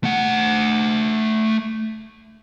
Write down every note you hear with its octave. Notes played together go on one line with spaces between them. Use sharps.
A3 F#5